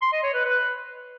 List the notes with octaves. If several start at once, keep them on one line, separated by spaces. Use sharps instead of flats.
C6
D#5
C#5
B4
B4